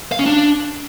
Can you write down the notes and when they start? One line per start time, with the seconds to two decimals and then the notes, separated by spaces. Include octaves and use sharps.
0.12 F5
0.19 C#4
0.26 D4